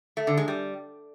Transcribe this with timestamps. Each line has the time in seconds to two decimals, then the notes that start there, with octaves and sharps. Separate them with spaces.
0.17 A3
0.27 D3
0.37 G#3
0.48 G3